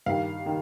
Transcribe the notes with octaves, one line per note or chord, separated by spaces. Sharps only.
G2 D#3 F5
D#3